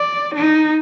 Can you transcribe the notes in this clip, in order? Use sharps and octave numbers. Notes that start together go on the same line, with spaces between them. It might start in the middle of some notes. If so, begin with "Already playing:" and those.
Already playing: D5
D#4